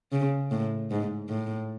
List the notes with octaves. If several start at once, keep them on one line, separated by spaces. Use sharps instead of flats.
C#3
A2
G#2
A2